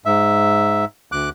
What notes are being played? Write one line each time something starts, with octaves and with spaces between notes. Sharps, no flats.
G#2 E5
D2 D6 F#6